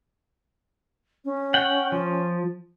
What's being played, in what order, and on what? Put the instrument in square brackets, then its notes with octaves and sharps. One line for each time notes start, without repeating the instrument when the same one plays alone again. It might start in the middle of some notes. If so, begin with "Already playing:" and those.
[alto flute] C#4
[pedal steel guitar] F#5 G5
F3